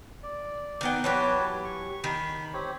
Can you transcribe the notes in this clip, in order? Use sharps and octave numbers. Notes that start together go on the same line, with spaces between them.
D5
D#3 B3 G5
E3 F#3 G4 B4 C#5 A5
C#6
D#3 B5
C4 G4 C#5